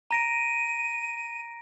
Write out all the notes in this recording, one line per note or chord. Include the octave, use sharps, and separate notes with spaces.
A#5 A#6 D7 D#7